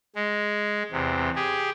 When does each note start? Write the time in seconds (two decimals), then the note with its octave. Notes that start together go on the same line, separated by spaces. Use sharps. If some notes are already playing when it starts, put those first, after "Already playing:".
0.16 G#3
0.92 E2 C3
1.36 G4 G#4